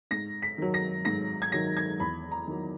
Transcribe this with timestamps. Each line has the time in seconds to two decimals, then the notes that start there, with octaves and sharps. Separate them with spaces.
0.11 G#2 A#6
0.42 B6
0.58 D#3 F#3
0.74 A#6
1.05 G#2 A#6
1.42 G#6
1.52 D#3 F#3 A#6
1.77 G#6
2.00 E2 B5
2.31 A#5
2.47 D#3 F#3